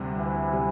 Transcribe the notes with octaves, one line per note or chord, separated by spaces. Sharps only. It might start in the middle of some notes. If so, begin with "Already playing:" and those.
Already playing: D2 C3 G3
D2 E3
C3 G3